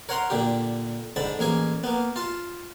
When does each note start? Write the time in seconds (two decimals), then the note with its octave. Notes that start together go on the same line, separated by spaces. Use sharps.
0.09 A#4 C#5 F#5 A#5 C6
0.30 A#2 D3 G4
1.16 G#2 D3 A5 B5
1.39 A1 A#3 G#4 G#5
1.84 A#3 B3
2.16 F4 A5